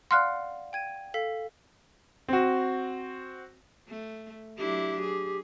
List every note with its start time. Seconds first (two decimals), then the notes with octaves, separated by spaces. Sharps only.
0.11 D5 F5 F#5 C6 F6 F#6
0.73 G5 G#6 D#7
1.14 A4 F5 B6
2.28 C4 F#4
3.89 A3
4.58 F#3 D4 E4 G4
5.02 G#4